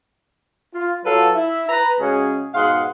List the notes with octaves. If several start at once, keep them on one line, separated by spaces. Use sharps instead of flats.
F4
F#3 F4 A4 B4 F5 A5
E4 E5
B4 A#5
C#3 G#3 C#4 F#4 G#4
G#2 B2 G#4 F5 F#5 C6